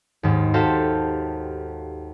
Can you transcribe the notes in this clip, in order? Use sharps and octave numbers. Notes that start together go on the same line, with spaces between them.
D#2 G#2
F#4 G4 A4 C5 F5